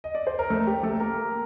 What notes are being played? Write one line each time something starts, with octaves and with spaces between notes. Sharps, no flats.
D#5
D5
C5
A#4
A3 A4
G4
A3 A4
A#3 A#4